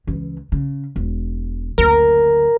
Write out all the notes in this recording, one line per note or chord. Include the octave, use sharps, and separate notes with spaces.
C#2 E3
C#3
E1
F#1 D2 A#4